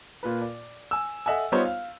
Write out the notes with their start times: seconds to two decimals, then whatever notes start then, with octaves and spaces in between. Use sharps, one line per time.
0.23 A#2 F4 B4
0.41 D5
0.91 G#5 E6
1.26 A4 D#5 E5 F#5 G#5
1.52 G3 B3 D#4 F4 C5 C#5
1.66 F5